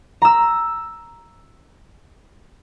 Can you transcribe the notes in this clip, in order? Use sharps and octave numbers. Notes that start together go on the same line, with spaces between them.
A#5 E6